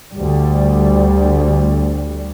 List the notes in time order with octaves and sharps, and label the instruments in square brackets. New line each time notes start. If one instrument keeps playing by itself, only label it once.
[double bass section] D2 G3